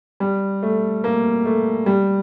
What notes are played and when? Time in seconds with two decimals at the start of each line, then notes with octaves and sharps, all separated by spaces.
0.20 G3
0.63 A3
1.04 A#3
1.45 A3
1.86 G3